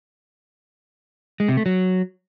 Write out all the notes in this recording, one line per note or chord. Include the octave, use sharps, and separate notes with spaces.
G#3
C3
A3
F#3